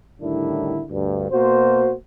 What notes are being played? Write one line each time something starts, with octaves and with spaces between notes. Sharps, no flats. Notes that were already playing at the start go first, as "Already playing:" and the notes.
A2 D3 D#3 G3 D4 E4
D2 G2
B2 A#3 F#4 C5